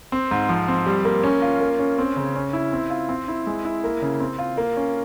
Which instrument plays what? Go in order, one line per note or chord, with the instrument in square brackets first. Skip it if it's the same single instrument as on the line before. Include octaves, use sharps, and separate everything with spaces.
[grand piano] C4
G#2
F3
C4
G3
A#3
C#4
F4
A#3
C#4
C4
C#3
C#4
E4
C4
F4
C4
E4
G#3
E4
A#3
C#3
C4
F4
A#3
C#4